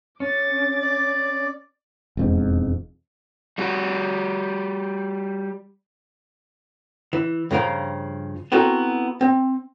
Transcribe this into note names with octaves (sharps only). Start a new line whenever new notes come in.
C#4 D6 A6
D5
E1 F2 G#2
G3 F#4
E3
G2 C#3 F3 A#4 F5
B3 C4 E4 F#4 A4 A#4
C4